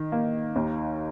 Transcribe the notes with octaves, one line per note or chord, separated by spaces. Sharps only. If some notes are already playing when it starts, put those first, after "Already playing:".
Already playing: D#3
A#3
D#2